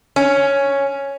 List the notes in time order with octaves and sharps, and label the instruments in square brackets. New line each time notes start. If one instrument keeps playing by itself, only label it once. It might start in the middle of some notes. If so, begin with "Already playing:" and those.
[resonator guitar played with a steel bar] C#4